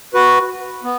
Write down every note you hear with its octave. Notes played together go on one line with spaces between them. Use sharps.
F#4 B4
B3